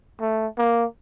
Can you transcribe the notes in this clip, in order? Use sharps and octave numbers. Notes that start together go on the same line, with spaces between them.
A3
A#3